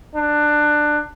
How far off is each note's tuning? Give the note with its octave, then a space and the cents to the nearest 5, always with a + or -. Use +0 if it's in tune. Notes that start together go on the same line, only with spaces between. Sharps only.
D4 +20